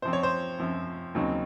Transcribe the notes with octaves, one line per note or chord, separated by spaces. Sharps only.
F#2 F3 C4 C5
C#5
C5
F#2 F3 C4
D#2 C#3 F#3 C4 D#4